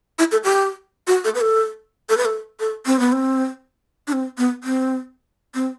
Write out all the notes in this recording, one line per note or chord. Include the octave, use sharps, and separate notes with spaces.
E4
A4
G4
F#4
A4
B4
A4
A4
B4
A4
A4
C4
B3
C4
D4
C4
B3
C4
C4